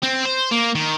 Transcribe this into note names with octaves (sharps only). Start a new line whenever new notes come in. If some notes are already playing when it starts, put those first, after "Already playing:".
C4
C5
A#3
D#3